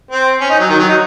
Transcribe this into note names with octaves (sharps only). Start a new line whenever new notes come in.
C4
C#4
D#4
F#3
D#3
F#3
D#4